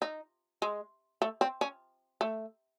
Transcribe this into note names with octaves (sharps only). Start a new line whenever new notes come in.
D#4
G#3
A3
C4
C#4
A3